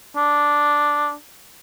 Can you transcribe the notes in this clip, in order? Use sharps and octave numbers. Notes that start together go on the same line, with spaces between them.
D4